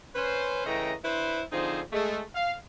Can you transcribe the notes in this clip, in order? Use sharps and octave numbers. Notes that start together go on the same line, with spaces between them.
C#4 B4 C5
C#3 E3 A3 D#5 G5 A#5
D4 E4 B4 C5
D3 F3 C4 D#4 G#4 C5
G#3 A3
F5